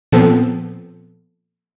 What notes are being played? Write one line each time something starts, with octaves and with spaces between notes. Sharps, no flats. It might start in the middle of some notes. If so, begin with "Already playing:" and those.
A#2 F3 B3 C4 A4